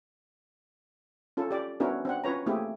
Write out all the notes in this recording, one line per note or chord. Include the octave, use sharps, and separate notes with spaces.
C#4 F4 A4
G4 D5
B3 C#4 D4 E4 F#4 A#4
C4 D4 F#5
C#4 F4 B4 C#5 A#5
A3 A#3 C4 E4 G4 G#4